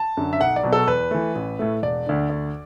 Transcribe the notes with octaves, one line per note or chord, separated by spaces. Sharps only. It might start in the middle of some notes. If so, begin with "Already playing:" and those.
Already playing: A5
F#2 D3
E5
B1 F#5
D5
B2 F#3
A4
E2 B4
E3 A3
A1
A2 A3
E1 D5
D2 D3
D2